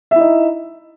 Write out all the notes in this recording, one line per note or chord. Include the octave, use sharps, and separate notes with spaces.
D#4 E4 E5